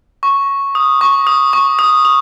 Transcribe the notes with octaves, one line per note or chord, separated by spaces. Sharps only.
C#6
D#6
C#6
D#6
C#6
D#6
D#6